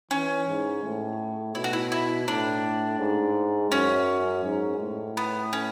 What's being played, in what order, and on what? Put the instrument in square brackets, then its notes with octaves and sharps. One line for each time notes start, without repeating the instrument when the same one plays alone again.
[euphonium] E3 [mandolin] C#4
[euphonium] G#2
A2
[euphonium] B2 [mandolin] E4
[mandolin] F#4
E4
E4
[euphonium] A2 [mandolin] D4
[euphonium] G#2
[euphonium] F#2 [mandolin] C#4
[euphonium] G#2
A2
[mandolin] B3
C#4